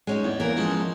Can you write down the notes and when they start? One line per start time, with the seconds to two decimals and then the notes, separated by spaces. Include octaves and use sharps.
0.07 G#3 C#4 D#4
0.24 E2
0.40 E3 A#3 A#4
0.57 F3 G#3 C#4